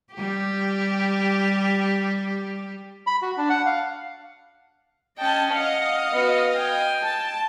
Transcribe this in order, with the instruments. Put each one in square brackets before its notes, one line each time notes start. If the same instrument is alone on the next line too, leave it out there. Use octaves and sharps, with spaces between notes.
[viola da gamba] G3 G4
[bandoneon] B5
F#4
D4
F#5
F5
[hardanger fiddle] C#4 G5 [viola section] D#5 A5
[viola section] D#5 F5 [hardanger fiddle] F#5
[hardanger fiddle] B3 F#4
G5 G#5
[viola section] A5